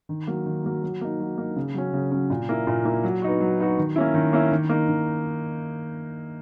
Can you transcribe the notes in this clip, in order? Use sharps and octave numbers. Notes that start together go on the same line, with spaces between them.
D#3
F#3 A#3
D#3
F#3 A#3
F#3
A#3 D#4
F#3
A#3 D#4
C#3
F#3 C#4
C#3
F#3 C#4
A#2
A#3 E4
A#2
A#3 E4
F#3
B3 D#4 F#4
F#3
B3 D#4 F#4
D#3
A#3 C#4 E4
D#3
A#3 C#4 E4
D#3
A#3 D#4
D#3